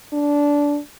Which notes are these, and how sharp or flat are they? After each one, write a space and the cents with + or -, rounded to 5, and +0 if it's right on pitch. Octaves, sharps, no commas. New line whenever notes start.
D4 -15